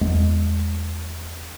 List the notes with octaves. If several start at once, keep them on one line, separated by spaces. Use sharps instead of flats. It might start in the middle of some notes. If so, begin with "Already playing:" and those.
E2 G#3 B3